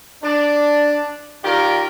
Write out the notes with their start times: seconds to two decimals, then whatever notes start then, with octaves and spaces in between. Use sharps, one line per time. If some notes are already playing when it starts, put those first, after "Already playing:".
0.23 D4
1.44 D#3 F4 G4 A#4 D5